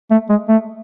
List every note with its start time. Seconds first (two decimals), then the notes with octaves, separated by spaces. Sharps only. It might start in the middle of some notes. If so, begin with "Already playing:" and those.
0.11 A3
0.29 G#3
0.49 A3